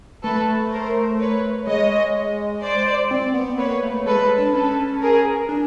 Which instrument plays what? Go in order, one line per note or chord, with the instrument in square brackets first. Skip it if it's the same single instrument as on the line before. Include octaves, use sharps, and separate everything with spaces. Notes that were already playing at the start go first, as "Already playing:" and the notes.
[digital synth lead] A3 [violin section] A4 B4
[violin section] A#4 C5
B4 C#5
[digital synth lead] G#3 [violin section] C#5 D#5
[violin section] C5 D5
[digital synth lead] C4
B3
[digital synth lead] A#3 [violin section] B4 C#5
[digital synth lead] A3
[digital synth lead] G#3 [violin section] A4 B4
[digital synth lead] G#3
D4
[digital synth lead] C#4 [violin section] A4 B4
[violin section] G#4 A#4
[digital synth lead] D4